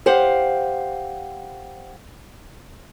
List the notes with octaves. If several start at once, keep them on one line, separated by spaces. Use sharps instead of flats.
G4 C5 F5 F#5